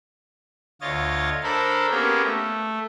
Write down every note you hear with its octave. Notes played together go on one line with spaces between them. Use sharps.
D2 F4 C#5 D#5 A6
D4 A4 A#4 C5 B5
A#3 B3 C#4 G4 G#4 A#4
A3